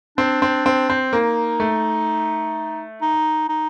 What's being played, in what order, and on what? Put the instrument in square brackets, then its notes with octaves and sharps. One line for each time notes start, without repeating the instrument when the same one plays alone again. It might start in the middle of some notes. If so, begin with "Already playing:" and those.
[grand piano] C4 [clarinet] D4
[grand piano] C4
C4
C4
[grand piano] A#3 [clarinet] D#4
[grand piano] A3
[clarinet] D#4
D#4